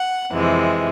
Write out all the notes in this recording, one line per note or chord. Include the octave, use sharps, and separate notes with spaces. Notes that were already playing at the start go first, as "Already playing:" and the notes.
Already playing: F#5
F2 C3 E3 G#3